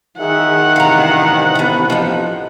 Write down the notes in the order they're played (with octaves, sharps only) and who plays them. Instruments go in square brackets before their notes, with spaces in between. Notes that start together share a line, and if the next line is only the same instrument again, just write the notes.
[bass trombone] D#3 [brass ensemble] G#4 E5 [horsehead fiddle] F#5
[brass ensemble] A1 G2 C3 [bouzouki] F5 A#5
[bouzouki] A3 B3
F3 D#4